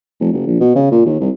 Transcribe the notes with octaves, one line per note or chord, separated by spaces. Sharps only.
F1
F#1
A#1
B2
C#3
A#2
D#2
C2